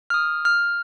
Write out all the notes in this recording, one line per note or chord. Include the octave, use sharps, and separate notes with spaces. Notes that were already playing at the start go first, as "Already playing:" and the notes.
F6
D#6
F6